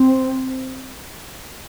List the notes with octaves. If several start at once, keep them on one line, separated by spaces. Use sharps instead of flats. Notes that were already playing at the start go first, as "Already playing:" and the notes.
Already playing: C4